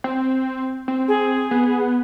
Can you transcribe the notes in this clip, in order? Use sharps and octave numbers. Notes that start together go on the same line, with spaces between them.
C4
C4
G#4
B3